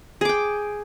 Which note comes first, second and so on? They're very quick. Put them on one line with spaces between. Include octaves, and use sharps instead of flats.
G#4 D6 G5